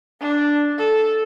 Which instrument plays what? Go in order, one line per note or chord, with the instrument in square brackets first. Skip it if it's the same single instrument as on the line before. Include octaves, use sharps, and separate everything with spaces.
[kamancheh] D4
A4